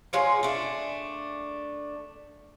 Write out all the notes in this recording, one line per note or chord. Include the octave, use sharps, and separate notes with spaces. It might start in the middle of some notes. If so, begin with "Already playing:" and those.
G#3 F4 C#5
A3 D4